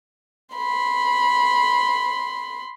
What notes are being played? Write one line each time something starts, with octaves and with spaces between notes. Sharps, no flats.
B5 C6